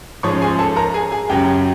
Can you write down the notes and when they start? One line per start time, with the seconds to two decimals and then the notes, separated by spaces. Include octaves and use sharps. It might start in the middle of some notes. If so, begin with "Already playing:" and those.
0.23 G#2 F3 G#3 C#4 C#5 C#6
0.42 G#4 G#5
0.59 A4 A5
0.76 A#4 A#5
0.94 G#4 G#5
1.12 G#4 G#5
1.29 F#2 C#3 F#3 G4 G5